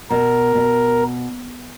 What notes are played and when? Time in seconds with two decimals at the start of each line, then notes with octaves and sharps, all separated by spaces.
0.10 B2 A#4
0.55 B2